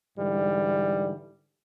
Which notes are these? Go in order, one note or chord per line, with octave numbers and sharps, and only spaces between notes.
G#2 D3 E3 G3